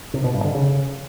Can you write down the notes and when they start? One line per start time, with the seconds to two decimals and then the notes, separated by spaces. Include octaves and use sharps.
0.14 C3
0.24 B2
0.34 G2
0.44 D3
0.55 C#3